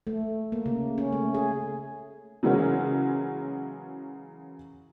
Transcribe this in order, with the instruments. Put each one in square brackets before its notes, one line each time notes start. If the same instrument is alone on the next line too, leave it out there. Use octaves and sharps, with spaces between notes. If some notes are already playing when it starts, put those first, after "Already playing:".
[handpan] A3
A#3
C#3
C#4
A3
G#4
[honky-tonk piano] C#3 E3 F#3 G#3 A#3 C#4